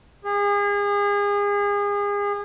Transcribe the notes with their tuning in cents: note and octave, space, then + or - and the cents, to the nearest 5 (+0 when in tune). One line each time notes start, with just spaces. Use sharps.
G#4 -35